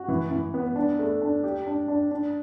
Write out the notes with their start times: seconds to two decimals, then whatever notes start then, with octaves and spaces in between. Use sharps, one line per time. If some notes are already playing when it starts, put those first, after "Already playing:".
Already playing: F#4
0.08 E3
0.31 E3
0.54 B3
0.76 D4
0.99 A3
1.22 D4
1.43 G4
1.67 D4
1.88 D4
2.11 D4